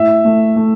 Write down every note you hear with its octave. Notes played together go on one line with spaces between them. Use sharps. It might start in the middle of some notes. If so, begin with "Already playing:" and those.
Already playing: A2 E5
A3
A3